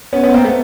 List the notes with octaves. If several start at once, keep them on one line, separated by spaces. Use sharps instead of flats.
B3 C#4
B3 C#4
A#3 C4
A3 B3